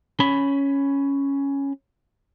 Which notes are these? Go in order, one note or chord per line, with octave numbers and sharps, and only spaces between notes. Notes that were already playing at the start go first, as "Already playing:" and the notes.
C#4 B5